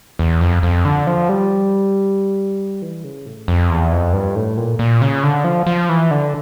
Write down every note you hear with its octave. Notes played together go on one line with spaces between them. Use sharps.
E2
F2
F2
D3
F3
G3
E3
C#3
A2
F2
E2
F2
G2
A2
A#2
A#2
C#3
D3
F3
F3
E3
D3